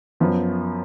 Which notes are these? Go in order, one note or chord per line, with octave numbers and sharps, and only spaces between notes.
F#2 F3 B3